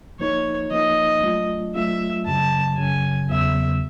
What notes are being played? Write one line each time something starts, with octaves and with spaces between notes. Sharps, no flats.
F3 A#3 D#4 C#5
F3 A#3 D#4 D#5
F#3 A3 D4 F4
F#3 A3 D4 F4 E5
F#2 C#3 F#3 A5
F#2 C#3 F#3 G#5
E2 C#3 F#3 B3 E5